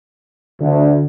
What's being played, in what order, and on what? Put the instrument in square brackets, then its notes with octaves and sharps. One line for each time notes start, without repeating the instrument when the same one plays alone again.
[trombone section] D2 [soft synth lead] D3